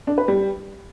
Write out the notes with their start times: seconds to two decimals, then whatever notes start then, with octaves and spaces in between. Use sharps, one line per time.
0.07 D4
0.18 B4
0.28 G3